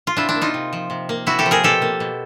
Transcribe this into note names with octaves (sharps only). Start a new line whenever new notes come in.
F4
C3 D4 E4
D4 E4
A#3
D#4 F4
C3
F3
C3
A#3
C3 E4 F#4
G4 A4
F3
G#4 A#4
B2 G4 A4
A#3
B2